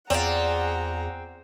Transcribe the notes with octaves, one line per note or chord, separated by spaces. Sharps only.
E2 C4 F4 G#4 D5 F#5 A#5